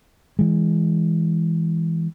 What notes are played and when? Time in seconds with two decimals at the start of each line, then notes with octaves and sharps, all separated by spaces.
0.39 E3 G#3